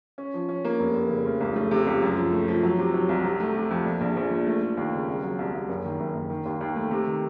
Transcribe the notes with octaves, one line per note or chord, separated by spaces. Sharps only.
C#4
F3
C#4
A#3
F1
F1
C#3
F1
C#2
A3
C3
C#2
F#2
F3
A3
F3
F#3
C3
F#3
C2
C3
A3
C3
F2
A#2
A#1
A#1
A#2
A3
A3
D#2
C#3
C2
F#3
C2
C2
F#1
D#3
F#1
F#1
D#3
D#2
D#2
A3
C3
D#3